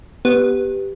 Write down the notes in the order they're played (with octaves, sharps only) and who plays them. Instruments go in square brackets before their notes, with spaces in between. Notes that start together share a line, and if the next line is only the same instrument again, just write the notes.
[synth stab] B3 [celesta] G4